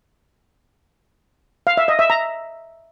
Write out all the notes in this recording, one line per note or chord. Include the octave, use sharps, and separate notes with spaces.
F5
E5
D#5
E5
A#5